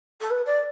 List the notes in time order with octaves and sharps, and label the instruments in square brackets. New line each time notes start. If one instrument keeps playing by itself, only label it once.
[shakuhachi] A4
B4
D5